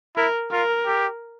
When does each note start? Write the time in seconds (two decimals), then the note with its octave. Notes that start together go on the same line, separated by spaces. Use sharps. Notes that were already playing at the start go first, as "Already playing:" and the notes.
0.16 E4 A#4
0.51 F4 A#4
0.86 G4